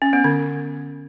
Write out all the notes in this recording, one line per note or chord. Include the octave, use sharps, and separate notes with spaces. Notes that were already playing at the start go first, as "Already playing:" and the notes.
C#4
B3
D3